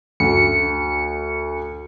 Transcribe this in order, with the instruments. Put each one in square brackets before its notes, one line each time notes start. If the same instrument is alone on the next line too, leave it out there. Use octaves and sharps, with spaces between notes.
[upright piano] D2 [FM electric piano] C#7